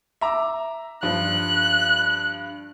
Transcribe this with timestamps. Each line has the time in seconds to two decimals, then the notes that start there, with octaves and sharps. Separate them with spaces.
0.21 E5 A#5 D6
1.03 G2 F3 F#6